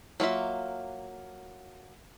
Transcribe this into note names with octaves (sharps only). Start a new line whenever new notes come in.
F#3 A#3 F4 E5